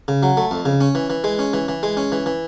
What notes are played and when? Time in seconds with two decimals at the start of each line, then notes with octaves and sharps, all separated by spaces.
0.08 C#3
0.23 F#3
0.37 A3
0.51 F2
0.65 C#3
0.81 C#4
0.95 E3
1.10 E3
1.24 G#3
1.39 C#4
1.53 E3
1.68 E3
1.83 G#3
1.97 C#4
2.12 E3
2.26 E3